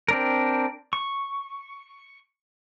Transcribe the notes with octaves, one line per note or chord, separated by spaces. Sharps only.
C4 D4 A#4
C#6